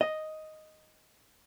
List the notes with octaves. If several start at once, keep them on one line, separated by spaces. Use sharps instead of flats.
D#5